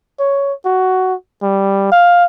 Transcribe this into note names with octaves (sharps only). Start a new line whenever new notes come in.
C#5
F#4
G3
F5